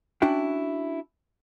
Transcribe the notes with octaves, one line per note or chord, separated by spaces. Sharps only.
C#4 D4 E4 F#4 G5